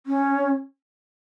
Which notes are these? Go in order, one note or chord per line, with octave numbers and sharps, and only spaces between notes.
C#4